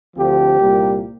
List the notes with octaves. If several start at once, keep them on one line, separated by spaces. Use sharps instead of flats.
D2 D3 F3 C4 G4
C2 A#2 G3 A#3